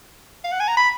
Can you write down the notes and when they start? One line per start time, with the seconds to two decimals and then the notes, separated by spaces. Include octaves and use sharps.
0.44 F5
0.52 F#5
0.60 G#5
0.68 A#5
0.77 B5